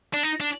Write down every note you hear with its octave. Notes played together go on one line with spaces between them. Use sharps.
D4
D#4
D4